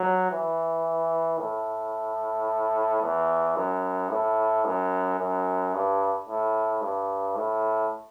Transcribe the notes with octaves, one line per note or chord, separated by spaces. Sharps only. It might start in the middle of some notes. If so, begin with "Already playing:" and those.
Already playing: F#3
E3
A2
E2
F#2
A2
F#2
F#2
G2
A2
G2
A2